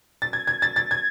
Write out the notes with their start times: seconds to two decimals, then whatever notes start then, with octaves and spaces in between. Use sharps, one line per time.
0.22 A6
0.33 G#6
0.47 G#6
0.62 A6
0.76 A6
0.91 G#6